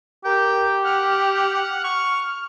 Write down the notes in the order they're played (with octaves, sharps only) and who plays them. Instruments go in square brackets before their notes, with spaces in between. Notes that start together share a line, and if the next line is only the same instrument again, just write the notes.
[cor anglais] G4 [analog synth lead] A#4 [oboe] G5
[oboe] F#5 [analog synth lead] F6
[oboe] C#6